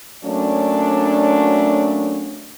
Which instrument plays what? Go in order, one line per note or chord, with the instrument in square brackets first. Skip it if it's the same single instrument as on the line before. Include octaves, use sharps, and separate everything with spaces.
[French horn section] F#3 A3 A#3 C#4 D4